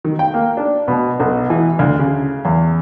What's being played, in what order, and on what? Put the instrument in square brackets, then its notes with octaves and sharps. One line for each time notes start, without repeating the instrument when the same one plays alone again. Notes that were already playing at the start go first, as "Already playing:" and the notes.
[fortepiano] D#3
G5
A#3
D4
B2
B1
E3
D2
C#3
E2